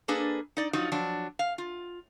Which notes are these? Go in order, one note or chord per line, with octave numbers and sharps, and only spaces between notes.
A#3 D4 G#4 A4 B4
D#4 D5
F3 F#3 D#4 F4 F#4
F3 F#3 D4
F5
F4